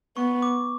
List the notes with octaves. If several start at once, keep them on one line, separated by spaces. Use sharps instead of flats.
B3 C#6
D6